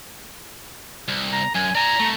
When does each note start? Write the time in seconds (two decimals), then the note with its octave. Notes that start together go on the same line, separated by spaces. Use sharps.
1.09 C2
1.32 A#5
1.55 F#2 G#5
1.75 D5 G#5 A#5
2.00 C2 A3